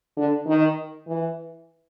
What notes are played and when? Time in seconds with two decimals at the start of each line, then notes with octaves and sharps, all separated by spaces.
0.17 D3
0.47 D#3
1.08 E3